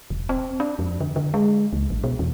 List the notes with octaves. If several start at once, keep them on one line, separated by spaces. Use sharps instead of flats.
E1
C4
D4
F2
D3
D3
G#3
C#2
A1
B2
E2